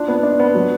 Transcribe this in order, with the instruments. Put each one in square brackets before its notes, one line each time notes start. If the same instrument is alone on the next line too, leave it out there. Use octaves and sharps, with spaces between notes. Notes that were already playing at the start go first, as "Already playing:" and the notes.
Already playing: [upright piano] D4 F4
B3
D4
B3
F#3